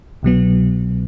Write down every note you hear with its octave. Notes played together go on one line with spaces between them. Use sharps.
C2 B2 F#3 B3